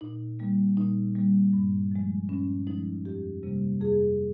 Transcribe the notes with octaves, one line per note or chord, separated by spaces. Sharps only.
A#2 D#4
G3 A#3
A#2 D#4
G3 A#3
G2
F3 G#3
G2 C#4
F3 G#3 D#4
F2 G4
C3 G3 A#3
F2 G#4